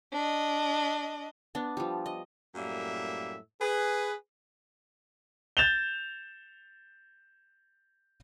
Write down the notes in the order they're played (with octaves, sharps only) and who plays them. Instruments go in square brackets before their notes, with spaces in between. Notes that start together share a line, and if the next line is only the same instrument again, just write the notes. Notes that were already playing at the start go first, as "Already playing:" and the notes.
[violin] D4 D#5
[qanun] B3 D4
F3 G3
D#5
[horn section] F#2 A2 G3 A#3 E5
G#4 B4
[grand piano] G6 A6 E7 F7 G7